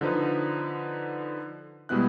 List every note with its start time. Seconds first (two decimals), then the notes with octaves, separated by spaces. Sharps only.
0.01 D3 F3 D#4 B4
1.89 B2 G3 G#3 B3 E4 F#6